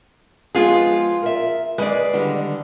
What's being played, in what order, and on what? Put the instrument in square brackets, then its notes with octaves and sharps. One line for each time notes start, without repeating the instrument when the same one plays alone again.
[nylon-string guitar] F3 G#3 B3 [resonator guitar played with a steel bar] F4 G#4
[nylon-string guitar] A#4 E5
[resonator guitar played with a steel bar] G#3 D5 [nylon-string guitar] B4
[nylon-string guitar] D3 D#3 G3